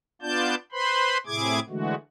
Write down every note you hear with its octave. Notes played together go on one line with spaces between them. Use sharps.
B3 D4 F4 D5 A5 G6
B4 C5 B5 C6
A2 C3 E4 G#4 D6 G#6
D3 E3 G#3 A3 F#4